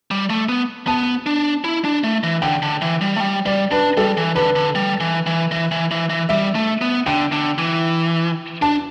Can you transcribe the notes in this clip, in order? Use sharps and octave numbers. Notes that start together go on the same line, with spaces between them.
G3
A3
B3
B3 A5
D4
E4
D4
A3
E3
D3 G5
D3
E3
G3
A3
G3
G3 D5
D4 B4
G3 A4
E3
D3 B4
D3
G3
E3
E3
E3
E3
E3
E3
G3 E5
A3
B3
D3 G5
D3
E3
D4 A5